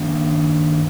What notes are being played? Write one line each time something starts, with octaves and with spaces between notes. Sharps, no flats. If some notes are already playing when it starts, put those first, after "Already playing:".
Already playing: D#3 A#3 D4